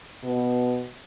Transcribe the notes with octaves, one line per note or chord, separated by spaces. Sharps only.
B2